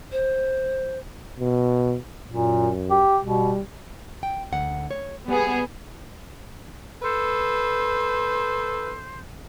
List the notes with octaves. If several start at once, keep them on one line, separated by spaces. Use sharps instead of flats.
C5
B2
F#2 A#2
G4
B2 G3
G5
D2 F#5
C#5
G3 B3 G#4
A4 B4 C5